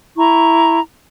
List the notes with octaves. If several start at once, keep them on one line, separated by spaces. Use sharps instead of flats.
E4 A#5 C#6